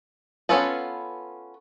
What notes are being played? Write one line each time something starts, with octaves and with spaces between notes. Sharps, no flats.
B3 C#4 F4 A4 B4